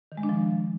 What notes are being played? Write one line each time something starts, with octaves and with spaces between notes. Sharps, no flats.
D#3
G#3
D4
F3